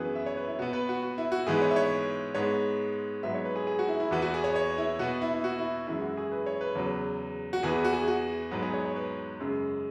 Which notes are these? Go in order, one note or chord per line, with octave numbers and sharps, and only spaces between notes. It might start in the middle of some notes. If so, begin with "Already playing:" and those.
Already playing: F#2 E3 B3 F#4 G#4 B4
E5
C#5
B4
E4
B2 B3 F#4
B4
F#4
F#4
E4
F#4
G#2 E3 B3 G#4
C#5
E5
C#5
G#2 G#3 B3 C#5
G#2 F#3 B3 E5
C#5
B4
G#4
G#4
F#4
E4
E4
E2 E3 B3 F#4
F#4
G#4
C#5
C#5
E4
B2 B3 F#4
E4
E4
F#4
E4
F#2 E3 G#3 E4
F#4
G#4
B4
C#5
B4
E2 C#3 F#3
F#4
E2 E3 B3 G#4
F#4
G#4
F#4
G#2 F#3 B3 B4
G#4
C#5
C#5
B4
F#2 C#3 G#3